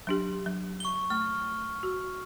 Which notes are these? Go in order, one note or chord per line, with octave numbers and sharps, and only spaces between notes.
F#3 D4 G4
F#3
C#6 G7
A3 F6
F#4